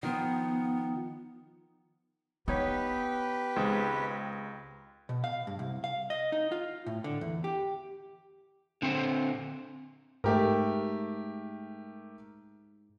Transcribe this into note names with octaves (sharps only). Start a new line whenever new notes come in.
D#3 F3 B3
B3 D#4 G4 B4 C#5
C#2 D#3 G#3 C4
B2
F5
G2
C2
F5
D#5
D#4
F4
A2
D3
E2
G4
D3 C4 C5
G#2 A3 G4 A#4